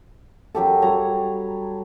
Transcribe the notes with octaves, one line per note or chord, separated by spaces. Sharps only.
F#2 F#3 G4 A4
F#3 G3 C#5 A#5